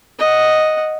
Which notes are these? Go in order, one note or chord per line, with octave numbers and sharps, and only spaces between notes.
D#5 F#5